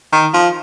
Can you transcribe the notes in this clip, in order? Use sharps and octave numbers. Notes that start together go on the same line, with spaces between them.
D#3
F3